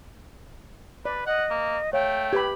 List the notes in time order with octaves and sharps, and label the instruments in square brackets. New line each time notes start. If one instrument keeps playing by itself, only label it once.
[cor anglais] B4 [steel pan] D5
[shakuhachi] D#5 [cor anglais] F#5
[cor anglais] A#3
[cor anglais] A3 [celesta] C#5 F5 [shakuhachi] G5
[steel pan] G4 B4 B5 [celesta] G#6